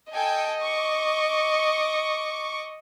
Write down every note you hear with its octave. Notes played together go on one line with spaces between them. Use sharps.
A4 D#5 G5 G#5
C#6 D6